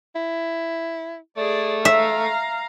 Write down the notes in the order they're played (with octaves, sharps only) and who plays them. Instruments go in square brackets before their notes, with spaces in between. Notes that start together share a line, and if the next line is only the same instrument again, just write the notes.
[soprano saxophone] E4
[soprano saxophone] A3 [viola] G#4 D5
[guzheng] E5 [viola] F5 A#5